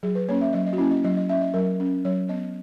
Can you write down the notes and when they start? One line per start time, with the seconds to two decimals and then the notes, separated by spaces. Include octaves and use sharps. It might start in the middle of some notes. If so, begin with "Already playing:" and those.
0.03 F#3 G#4
0.15 B4
0.28 A#3 C#4 C#5
0.41 E5
0.53 F#3 D#5
0.67 D#5
0.73 F#4
0.78 A#3 C#4 E4
0.91 D#5
1.04 F#3 D#5
1.17 D#5
1.29 C#4 E5
1.41 D#5
1.54 F#3 A#4
1.80 C#4
2.05 F#3 C#5
2.29 B3 D#5